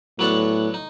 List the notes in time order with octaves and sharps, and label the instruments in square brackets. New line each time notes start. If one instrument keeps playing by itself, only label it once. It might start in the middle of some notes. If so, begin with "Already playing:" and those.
[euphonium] A2 [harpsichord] F#3 B3 D4 F#4 A4
[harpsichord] D#4